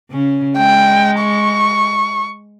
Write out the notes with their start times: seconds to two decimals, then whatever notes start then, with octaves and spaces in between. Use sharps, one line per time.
0.11 C#3 C#4
0.57 G#3 G5
1.21 C#6